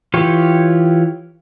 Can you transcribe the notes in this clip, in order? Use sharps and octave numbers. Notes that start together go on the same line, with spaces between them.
E3 F4 G4 C#5